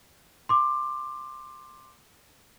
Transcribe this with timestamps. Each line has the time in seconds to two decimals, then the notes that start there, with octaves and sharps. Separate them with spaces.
0.49 C6 D6